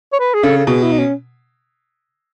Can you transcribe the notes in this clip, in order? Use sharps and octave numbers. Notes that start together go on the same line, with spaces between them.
C#5
B4
G#4
C#3 A4
A4
B2 G#4
E4
D#4
C#4